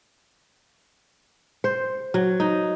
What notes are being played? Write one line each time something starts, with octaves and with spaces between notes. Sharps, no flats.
C5
F#3
D#4